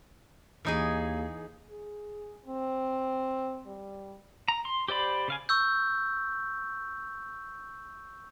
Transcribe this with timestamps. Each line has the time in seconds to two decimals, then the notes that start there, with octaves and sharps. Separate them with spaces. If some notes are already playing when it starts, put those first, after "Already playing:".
0.65 D#2 E3 D#4 G#4
1.70 G#4
2.46 C4
3.67 G3
4.48 A#5
4.65 C6
4.88 G4 C5 D5 B5
5.28 C#3 F5 G#5
5.49 C#6 E6 G6